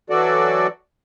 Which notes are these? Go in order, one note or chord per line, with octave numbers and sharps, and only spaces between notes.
E3 F#3 F#4 A4 D5